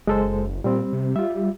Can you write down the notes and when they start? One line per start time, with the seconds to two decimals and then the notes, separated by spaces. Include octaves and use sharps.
0.07 F#1 G#3 A4 C5
0.64 A#2 G3 C4
0.93 C3
1.16 G3 F4 E5